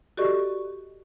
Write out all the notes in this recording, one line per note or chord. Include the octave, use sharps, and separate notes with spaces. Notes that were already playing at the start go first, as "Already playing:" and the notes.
F#4 G4 A4 D5 D#5 C#6